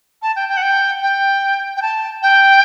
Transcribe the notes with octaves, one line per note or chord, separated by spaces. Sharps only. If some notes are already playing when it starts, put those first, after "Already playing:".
A5
G5
G5
F#5
G5
G5
G5
A5
G5